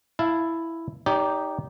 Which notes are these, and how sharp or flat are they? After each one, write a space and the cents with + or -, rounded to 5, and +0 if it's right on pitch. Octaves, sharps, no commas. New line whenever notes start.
E4 +0 F5 -10 A5 +0
D#4 +0 G4 +0 D5 -45